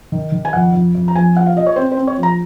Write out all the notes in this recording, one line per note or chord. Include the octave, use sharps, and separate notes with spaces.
D#3
D#3
G#5
F2 F#5
F2
F2
A#5
A#1 G#5
A#1 F#5
F5
A#2 D#5
C#5
C4 C5
C5
C4
C#5
A#1
A#5